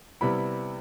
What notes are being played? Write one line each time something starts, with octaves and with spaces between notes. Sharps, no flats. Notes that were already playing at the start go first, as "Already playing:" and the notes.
C3 G3 B3 E4 B5